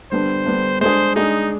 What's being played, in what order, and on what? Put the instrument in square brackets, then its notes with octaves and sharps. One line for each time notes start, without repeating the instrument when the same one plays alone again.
[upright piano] D3 G3 B3 D4 [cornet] C5
[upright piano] D3 G3 B3 D4
[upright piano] G#3 D4 G#4 [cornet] C5
[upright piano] G#3 D4 G#4 [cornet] D#4